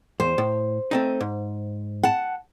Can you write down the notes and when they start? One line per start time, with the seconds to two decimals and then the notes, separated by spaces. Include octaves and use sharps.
0.20 E2 C5
0.38 A2
0.91 A3 C4 D#4
1.20 G#2
2.03 F#5 A5